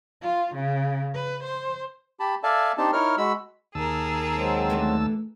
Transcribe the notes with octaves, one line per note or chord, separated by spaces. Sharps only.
F4
C#3
B4
C5
G4 A5 B5
A4 D5 E5 F5 G#5 A5
C4 D4 D#4 G4 A5
D#4 E4 A#4 C#5 F6
G#3 F#4 B5 E6
D#2 G#4 A#4 A5 E6
F#3 G#3 C4
E3 A3 D4